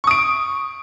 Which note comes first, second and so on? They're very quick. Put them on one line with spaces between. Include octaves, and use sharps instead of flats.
C#6 D#6 D7